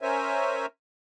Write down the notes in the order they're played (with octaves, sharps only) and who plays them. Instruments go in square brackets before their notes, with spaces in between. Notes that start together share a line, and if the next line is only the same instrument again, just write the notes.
[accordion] C#4 A#4 C5 C#5 E5 G#5